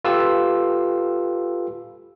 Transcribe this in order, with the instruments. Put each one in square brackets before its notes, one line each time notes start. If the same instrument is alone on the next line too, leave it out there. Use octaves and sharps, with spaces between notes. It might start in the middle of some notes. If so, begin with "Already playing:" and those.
[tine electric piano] F4 G4 A4 B4 E6